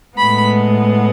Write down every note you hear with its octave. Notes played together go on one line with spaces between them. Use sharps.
A2 G#3 B3 B5